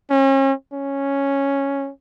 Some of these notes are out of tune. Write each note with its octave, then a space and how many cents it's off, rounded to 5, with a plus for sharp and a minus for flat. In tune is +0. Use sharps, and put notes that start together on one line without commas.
C#4 -40
C#4 +0